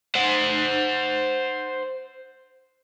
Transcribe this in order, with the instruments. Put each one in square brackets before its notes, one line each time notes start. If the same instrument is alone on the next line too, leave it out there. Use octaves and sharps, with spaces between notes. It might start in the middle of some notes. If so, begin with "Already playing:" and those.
[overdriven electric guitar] C5 F#5